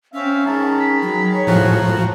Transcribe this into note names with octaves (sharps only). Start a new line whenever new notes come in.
C4 C#4 E5 F5
D#3 G#3 A5 A#5
B5
F#3
C#5
A2 F3 F#4